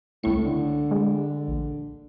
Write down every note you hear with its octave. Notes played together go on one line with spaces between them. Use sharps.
C#2 A2 C#6 C#7
D3
G#3
A#1